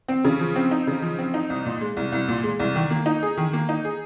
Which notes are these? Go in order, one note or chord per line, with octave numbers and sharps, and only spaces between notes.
C4
C#3
F3
C4
D#4
C#3
F3
C4
D#4
C2
A#2
G#3
C2
C2
A#2
G#3
C2
D#3
A#3
D#4
G#4
D#3
A#3
D#4
G#4